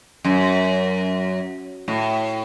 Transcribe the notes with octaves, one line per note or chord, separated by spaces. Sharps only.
F#2
A2